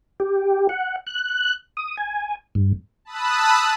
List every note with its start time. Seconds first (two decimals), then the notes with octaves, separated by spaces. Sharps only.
0.20 G4
0.69 F#5
1.07 F#6
1.77 D#6
1.98 G#5
2.55 G2
3.05 A5 B5 D#6 E6 F#6